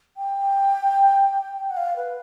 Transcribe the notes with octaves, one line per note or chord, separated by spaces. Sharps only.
G5
F#5
F5
B4